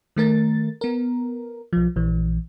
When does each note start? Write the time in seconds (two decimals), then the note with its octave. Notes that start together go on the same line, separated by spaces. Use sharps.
0.17 D#3 A3 A#4 A6
0.81 B3 A#4
1.73 B1 F3
1.96 A#1 E3